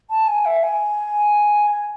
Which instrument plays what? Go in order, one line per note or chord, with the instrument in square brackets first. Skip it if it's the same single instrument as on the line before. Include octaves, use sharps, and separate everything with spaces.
[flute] A5
G#5
E5
G#5
G#5